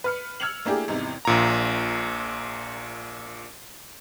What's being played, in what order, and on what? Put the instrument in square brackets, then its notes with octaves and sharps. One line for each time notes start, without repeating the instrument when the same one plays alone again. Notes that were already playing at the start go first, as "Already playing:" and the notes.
[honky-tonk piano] B4 F6 C#7
E6 F6 G#6 C#7 F7 F#7
A3 A#3 D4 E4 G4 G#4
G#1 E2 C3 D#4 E4
[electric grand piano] A#1 A#2 A#5